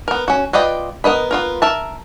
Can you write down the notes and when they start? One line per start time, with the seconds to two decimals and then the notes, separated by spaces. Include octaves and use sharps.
0.08 B3 A#4
0.28 C#4 F#4
0.53 F4 B4 D5 D#5 G5
1.04 B3 A#4 D#5 B5
1.31 B3 F4 A#4
1.62 A#4 E5 A5